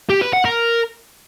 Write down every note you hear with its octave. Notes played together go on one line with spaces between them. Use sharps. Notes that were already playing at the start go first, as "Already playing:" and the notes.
G4
B4
F#5
A#4